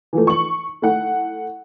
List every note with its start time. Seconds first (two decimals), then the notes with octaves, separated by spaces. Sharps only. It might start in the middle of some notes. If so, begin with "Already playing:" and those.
0.13 E3 F3 A3
0.27 C#6 F#7
0.82 A3 E4 F#5